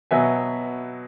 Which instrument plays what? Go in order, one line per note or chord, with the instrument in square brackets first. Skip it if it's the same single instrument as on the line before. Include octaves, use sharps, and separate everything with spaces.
[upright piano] B2 F#3 B3 E5 G#5